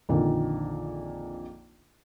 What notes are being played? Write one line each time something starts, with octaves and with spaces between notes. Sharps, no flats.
A#1 F2 A#2 D3 D#3